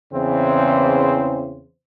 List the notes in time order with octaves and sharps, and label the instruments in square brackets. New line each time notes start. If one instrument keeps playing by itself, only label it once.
[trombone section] E2 C#3 E3 C4 C5